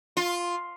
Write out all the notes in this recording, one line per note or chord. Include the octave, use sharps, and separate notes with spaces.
F4